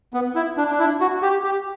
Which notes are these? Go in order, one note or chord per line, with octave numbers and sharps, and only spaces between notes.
B3
E4
D4
D4
E4
F#4
G4
G4